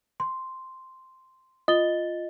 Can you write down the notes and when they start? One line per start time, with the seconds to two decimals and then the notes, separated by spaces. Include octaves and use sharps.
0.20 C6
1.68 F4 D#5 A6 G7